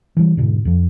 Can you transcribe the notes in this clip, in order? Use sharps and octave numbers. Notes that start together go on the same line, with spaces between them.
E3 G3
G#2 B2 D3
F2 F3